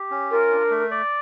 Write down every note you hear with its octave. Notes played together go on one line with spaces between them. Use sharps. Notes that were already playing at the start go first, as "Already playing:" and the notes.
Already playing: G4
C#4
F4 A#4
D4
A3
D5